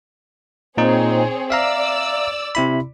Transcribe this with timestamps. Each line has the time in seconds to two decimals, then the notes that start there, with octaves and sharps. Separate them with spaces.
0.78 A#2 C4 D#4 G#4 C#5
1.50 D5 E5 F5 A#5 E6
2.55 C3 E4 B5